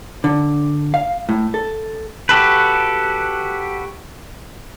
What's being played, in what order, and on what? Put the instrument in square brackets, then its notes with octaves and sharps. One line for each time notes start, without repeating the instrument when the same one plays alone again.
[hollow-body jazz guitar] D3
F5
A2
A4
[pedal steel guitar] F#4 G4 A4 B4